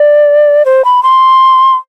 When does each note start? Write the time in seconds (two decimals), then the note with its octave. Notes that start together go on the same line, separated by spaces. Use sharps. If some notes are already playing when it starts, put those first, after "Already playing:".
Already playing: D5
0.65 C5
0.85 B5
1.03 C6